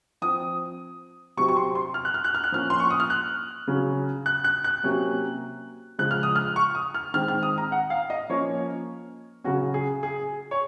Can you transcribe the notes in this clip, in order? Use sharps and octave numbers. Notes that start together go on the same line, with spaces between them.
F3 C4 D#6
C3 F#3 C4 C#6
C#6
C6
C6
F6
F#6
F6
F#6
F6
F#6
F3 A#3 C#4 F6
C6
C#6
D#6
F6
F#6
C#3 F#3 C#4
F#6
F#6
F#6
C3 F#3 A#3 C#4
C#3 F3 G#3 F#6
F6
D#6
F6
C#6
D#6
F6
D#3 G#3 C4 F6
F6
D#6
A#5
F#5
F5
D#5
F3 A#3 C#4 C#5
C#3 F#3 C#4 F#4
G#4
G#4
C#5